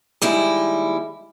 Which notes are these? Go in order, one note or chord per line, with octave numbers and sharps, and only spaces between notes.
D#2 G3 G#3 E4